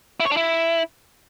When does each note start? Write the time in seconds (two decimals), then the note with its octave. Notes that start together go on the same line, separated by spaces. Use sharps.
0.20 E4
0.26 C#5
0.31 D4
0.37 E4